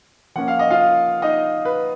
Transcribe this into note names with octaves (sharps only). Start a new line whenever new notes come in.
F3 A#3 C#4 F#5
F5
D#5
F4 F5
D#4 D#5
B4